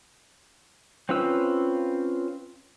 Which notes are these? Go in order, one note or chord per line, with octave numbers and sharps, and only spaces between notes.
C4 C#4 F4 B4 E6